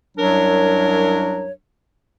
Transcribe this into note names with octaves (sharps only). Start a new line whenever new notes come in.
C2 F#2 F#3 D4 A#4 C#5